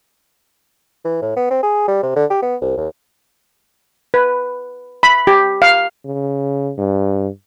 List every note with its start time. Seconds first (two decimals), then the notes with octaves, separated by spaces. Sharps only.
1.05 E3
1.22 A2
1.37 B3
1.51 C4
1.63 G#4
1.88 G3
2.03 C3
2.16 D3
2.30 G4
2.42 B3
2.62 C2
2.78 D#2
4.14 B4
5.03 B5
5.27 G4
5.62 F5
6.05 C#3
6.78 G2